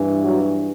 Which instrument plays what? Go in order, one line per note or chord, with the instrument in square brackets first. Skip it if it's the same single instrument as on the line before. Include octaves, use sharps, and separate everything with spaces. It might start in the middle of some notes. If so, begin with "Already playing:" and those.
Already playing: [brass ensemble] G2 E3
F#3 F#4